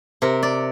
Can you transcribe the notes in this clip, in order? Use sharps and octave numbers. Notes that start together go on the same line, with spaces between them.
C3 A#4
D5